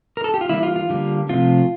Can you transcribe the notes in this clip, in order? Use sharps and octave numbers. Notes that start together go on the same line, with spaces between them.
A#4
A4
G4
F4
E3 G3 A#3 E4
F4
F4
D3 G3 A#3
C3 F3 A3 C4 F4